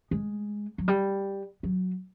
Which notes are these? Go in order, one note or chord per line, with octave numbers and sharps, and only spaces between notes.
G#3
F#3
G3
F#3